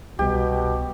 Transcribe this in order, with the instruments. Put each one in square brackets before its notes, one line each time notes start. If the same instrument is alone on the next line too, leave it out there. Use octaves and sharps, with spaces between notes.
[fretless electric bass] C2 G3 [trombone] B2 [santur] G4